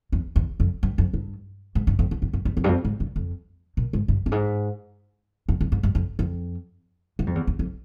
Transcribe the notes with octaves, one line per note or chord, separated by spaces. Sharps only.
E2
E2
F2
G2
F2
G2
G#2
G2
F2
E2
F2
G2
E2
F2
G2
F2
G#2
G2
F2
A#2
G#2
G2
G2
G#2
F2
F2
G#2
G2
F2
F2
G2
F2
E2
E2
F2